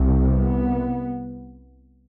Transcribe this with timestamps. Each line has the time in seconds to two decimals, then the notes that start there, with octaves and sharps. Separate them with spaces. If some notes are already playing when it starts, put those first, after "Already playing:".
Already playing: C2 C3
0.28 B3